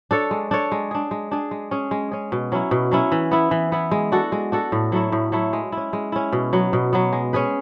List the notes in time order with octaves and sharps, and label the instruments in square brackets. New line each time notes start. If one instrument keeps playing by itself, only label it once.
[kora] D4 A4 C#5
G#3
D4 A4 C#5
G#3
D4 G#4
G#3
D4 G#4
G#3
C#4 G#4
G#3
C#4 G#4
B2
F#3 C#4 E4
B2
F#3 C#4 E4
E3
B3 E4
E3
B3 E4
G#3
D4 F#4 A4
G#3
D4 F#4 A4
A2
F#3 A3 E4
A2
F#3 A3 E4
G#3
C#4 E4
G#3
C#4 E4
B2
F#3 B3
B2
F#3 B3
G#3
C#4 G#4 B4